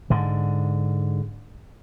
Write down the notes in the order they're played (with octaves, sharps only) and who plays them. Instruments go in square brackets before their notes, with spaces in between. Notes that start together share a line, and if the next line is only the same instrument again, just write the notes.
[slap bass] G#2 D3